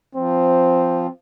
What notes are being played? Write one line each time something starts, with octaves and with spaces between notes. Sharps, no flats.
F3 C4